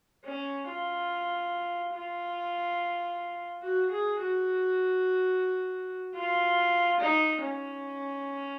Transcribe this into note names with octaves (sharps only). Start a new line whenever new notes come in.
C#4
F4
F4
F#4
G#4
F#4
F4
D#4
C#4